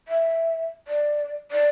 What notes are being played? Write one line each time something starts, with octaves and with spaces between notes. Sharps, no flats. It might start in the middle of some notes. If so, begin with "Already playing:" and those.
E5
D5
D5